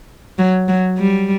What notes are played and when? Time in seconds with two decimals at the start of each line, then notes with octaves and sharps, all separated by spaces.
0.39 F#3
0.68 F#3
0.98 G3